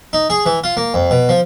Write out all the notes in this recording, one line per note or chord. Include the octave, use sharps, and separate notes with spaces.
D#4
G#4
E3
F4
A#3
F2
B2
F3